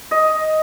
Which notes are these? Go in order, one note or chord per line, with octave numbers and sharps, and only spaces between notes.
D#5